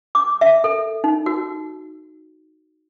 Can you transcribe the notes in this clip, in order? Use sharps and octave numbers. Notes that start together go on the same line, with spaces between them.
D6
E5
A4
D#4
F#4